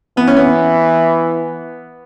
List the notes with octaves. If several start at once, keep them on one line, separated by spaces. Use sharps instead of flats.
E3 B3
C#4
B3